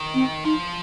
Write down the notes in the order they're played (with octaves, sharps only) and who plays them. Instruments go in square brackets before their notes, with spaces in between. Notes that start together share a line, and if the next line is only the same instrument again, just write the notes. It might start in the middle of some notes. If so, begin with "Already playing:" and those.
Already playing: [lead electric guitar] D#3
[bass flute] C4
[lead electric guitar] F3 [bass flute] D#4